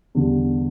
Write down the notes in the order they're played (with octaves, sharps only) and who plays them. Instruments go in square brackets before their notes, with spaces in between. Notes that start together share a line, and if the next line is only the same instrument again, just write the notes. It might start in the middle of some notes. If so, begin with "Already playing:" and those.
[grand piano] E2 D3 G3